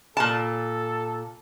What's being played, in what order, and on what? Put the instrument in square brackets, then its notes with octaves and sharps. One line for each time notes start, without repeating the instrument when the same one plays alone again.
[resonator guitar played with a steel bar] A#2 A5 [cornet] A4